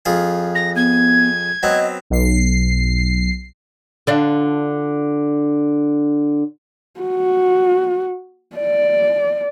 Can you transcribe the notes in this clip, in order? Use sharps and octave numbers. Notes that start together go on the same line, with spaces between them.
F2 F4 G#4
A#6
B3 G#6
F#3 B3 C4 D#5
B1 C7
D3 D4 F4
F#4
D5